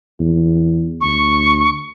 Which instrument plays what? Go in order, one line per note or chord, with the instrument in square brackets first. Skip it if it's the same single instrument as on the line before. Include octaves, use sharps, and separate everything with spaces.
[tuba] E2
[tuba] D2 [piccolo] C#6